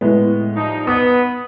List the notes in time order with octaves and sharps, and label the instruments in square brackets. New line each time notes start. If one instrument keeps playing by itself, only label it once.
[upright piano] A2 G#3 B3
[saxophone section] F3 G3 D#4
[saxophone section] B3 [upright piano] D#6